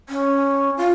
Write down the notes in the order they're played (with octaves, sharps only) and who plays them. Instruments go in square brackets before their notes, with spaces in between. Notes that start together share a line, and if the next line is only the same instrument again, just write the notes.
[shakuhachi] C#4
F4